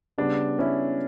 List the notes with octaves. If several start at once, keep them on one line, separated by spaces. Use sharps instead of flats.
C#3 G3 B3 D4
C#4 E4